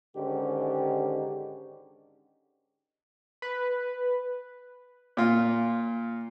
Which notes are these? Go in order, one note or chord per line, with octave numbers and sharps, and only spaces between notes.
G#2 D3 D#3 C#4 G4
B4
A#2 F4